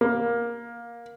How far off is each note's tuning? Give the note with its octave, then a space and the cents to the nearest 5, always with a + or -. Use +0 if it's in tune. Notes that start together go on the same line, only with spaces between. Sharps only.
A#3 +15